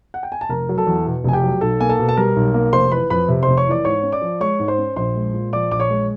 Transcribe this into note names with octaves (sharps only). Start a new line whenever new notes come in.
F#5
G5
G#5
A5
F1 A#4 A#5
F#3
A4 A5
E2
B2
F1 G#5
G4 G5
F#3
B1 A4 A5
A#3 G#5
A4 A5
B2
A5
G3 A#4 A#5
B1
A#3
F1 C5 C6
E3 B4 B5
F2 B4 B5
C3
F1 C5 C6
C#5 C#6
E3 D5 D6
G#2 C#5 C#6
C#4
D5 D6
F3
G#3 C#5 C#6
G#2
C5 C6
C#4
A#1 C5 C6
G#3
A#2
F3 D5 D6
A#1 D6
C#5 C#6
G#3